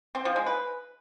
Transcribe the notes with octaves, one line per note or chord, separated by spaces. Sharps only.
C4
F3
G#3
B4